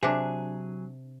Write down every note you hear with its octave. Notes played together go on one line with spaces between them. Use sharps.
C3 F#3 D4 G#4